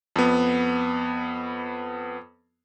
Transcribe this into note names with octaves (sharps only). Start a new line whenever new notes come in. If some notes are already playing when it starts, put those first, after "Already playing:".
F2 B3